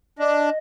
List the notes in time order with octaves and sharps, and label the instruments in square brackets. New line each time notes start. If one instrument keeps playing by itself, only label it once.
[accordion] D4 [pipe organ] D#5